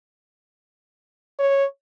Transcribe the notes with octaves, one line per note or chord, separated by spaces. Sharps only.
C#5